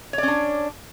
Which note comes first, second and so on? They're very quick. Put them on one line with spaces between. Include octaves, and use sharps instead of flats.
C#5 D5 C#4 D4